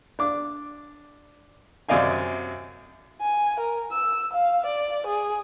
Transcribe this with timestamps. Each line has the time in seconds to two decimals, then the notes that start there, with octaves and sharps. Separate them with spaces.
0.19 D4 D6
1.89 F#2 C3 D5 D#5 F5 G#5
3.21 G#5
3.60 A#4
3.92 E6
4.33 F5
4.66 D5
5.07 G#4